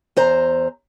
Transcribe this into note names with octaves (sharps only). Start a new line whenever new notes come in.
E2 C5 A#5